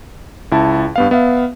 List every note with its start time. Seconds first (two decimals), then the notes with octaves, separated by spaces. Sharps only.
0.52 C#2 E4 A5
0.96 G2 B3 F5
1.11 B3 E5 F5